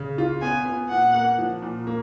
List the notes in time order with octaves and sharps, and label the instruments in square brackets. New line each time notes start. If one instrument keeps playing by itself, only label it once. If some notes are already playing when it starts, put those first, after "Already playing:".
Already playing: [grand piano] C#3
F4
[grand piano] B3 [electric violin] G#5
[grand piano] B3
[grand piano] A#2 [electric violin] F#5
[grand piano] A#3
F3
A#2
A#3